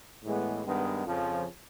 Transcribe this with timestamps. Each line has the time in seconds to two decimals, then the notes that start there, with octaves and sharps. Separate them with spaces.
0.24 A2 E3 G#3 B3
0.65 G2 D#3 G#3 B3
1.06 F2 C#3 F3